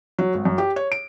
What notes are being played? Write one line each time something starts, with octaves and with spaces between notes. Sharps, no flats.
F#3
G#1
F#2
G4
C#5
D7